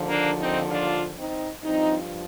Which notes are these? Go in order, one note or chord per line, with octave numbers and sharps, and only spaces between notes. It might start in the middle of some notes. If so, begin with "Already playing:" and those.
Already playing: D#2 D3 F3
A#3 D4
C4 D#4
D4 F4
C4 D#4
G2 F3 C4 D#4